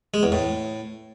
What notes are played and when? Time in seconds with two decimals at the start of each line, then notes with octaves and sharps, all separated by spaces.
0.14 G#3
0.23 E2
0.32 A2